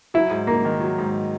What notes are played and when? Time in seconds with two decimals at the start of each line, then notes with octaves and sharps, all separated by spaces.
0.14 F#3 E4
0.31 G#2
0.47 G#2 A#3
0.65 D#3
0.81 F#3
0.98 G#2